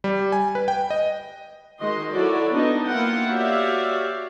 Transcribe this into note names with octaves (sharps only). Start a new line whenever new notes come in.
G3
G#5
B4
G5
D#5
D#3 G#3 F#4 D#5 C6
F#3 E4 F#4 A4 C#5 D5
B3 D4 D#4 D#5
A#3 E4 F4 F#5 G5
F#4 G4 C#5 D5 E5 F5